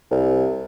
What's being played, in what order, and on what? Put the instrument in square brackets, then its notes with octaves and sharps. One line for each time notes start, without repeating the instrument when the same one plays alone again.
[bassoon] C2